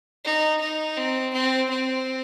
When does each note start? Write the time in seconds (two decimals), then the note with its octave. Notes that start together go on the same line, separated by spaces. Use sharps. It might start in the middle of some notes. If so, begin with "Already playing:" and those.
0.24 D#4
0.60 D#4
0.96 C4
1.33 C4
1.69 C4